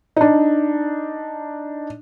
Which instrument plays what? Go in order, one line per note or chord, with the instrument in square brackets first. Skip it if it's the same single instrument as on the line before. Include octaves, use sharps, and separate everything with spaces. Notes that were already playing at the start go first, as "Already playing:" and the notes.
[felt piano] D4 D#4